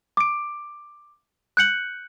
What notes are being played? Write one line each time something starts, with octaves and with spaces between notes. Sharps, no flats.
D6 D7
F#6 G6 C#7 F#7